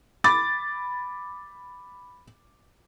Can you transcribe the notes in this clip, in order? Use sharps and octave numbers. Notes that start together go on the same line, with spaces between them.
B5 D6 A6